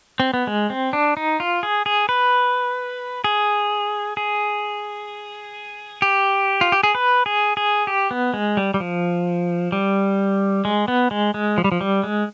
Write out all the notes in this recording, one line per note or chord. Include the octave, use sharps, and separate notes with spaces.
C4
B3
G#3
C4
D4
D#4
F4
G#4
G#4
B4
G#4
G#4
G4
F4
G4
G#4
B4
G#4
G#4
G4
B3
G#3
G3
G3
F3
G3
G#3
B3
G#3
G#3
F3
G3
F3
G3
G#3